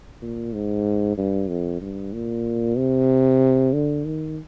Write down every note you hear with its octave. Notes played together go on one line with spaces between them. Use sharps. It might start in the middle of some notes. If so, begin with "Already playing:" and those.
A#2
G#2
G2
F2
G2
A#2
C3
D3
D#3